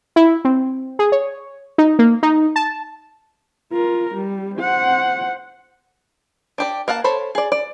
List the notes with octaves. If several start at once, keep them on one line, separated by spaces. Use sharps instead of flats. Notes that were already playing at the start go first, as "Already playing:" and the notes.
E4
C4
G#4
C#5
D#4
A#3
D#4
A5
F4 A#4
G3
C5 F#5
D4 G4 D5
A#3 F5 F#5 A5
A4 C5 C#5 B5
G#4 D5
D5